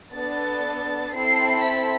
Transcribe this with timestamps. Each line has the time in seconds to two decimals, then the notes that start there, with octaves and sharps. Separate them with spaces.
0.14 B3 D4 A4 A6
1.14 C4 E4 A4 C7
1.64 B6